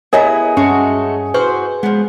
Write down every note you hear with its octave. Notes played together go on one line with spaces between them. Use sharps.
B3 E4 G#4 A#4 C#5 D#5 A#5
G2 G#3 A3 C#4 F#4
E3 F#4 B4 C5
F3 G#3 B3